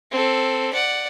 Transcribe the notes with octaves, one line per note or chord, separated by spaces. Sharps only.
C4 A4
D5 F#5